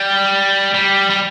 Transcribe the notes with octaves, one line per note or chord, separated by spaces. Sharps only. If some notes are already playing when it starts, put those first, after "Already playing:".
Already playing: G3
G3
G3